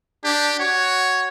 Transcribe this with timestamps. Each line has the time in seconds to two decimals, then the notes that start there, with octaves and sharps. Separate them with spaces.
0.24 D4 G4
0.59 F#4 C#5